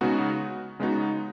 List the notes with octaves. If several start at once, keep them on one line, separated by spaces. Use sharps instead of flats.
C#3 G#3 B3 D#4 F#4
C#3 G#3 B3 D#4 F#4